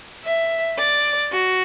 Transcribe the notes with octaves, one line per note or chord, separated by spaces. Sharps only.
E5
D5
F#4